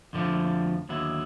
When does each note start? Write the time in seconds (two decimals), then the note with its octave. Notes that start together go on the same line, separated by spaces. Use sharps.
0.13 F2 D3 F3 A3
0.89 D#2 D3 F#3 B3 E4